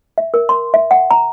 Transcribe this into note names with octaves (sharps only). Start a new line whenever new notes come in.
E5
A#4
C6
E5
F#5
A#5